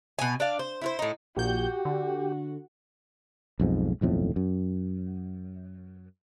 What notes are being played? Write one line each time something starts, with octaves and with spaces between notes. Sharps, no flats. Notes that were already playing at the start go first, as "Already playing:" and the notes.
B2 G#5
D4 D5 F5
C5
E4 F4 C5
A2 D#4
A#1 A#2 F#4 G4 G6
D3
B1 F2 G#2
D#1 B1 F2 A2
F#2